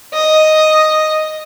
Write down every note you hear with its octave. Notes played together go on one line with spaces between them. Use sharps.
D#5